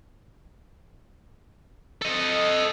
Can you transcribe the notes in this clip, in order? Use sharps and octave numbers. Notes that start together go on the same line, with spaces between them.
A4 D#5